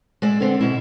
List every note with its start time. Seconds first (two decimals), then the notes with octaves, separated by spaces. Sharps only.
0.22 G#3 D5 E5
0.41 D3 B3 C4
0.61 B2 E4